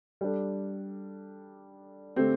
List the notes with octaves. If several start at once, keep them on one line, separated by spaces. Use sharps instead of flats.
G3 D4 A4
D3 A3 C4 G4